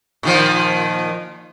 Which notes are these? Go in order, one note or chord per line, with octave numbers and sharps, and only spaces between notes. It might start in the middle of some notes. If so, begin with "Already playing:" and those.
A#2 D#3 F3